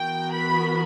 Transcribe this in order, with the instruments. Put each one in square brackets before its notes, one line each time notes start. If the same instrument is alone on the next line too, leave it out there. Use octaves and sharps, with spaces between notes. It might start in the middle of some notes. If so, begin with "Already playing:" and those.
Already playing: [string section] E3 B3 F#4 A#4 [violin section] G5
[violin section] B5